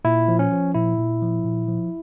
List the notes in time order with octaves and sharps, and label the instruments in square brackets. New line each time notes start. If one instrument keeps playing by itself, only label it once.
[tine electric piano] A#2 E4
F3
C#4
F3
A#2 E4
A#2
F3
A#2
F3